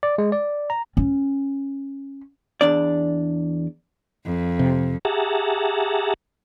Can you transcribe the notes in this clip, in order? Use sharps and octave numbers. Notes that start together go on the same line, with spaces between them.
D5
G#3
D5
A#5
C#4
E2 D4 D5
F2
C3
G4 G#4 E5 F#5 A5 A#5